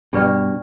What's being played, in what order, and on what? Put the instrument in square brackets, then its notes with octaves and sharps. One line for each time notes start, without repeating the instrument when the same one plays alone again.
[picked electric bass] G2 B2 [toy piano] D4 G4 B4 D5 G5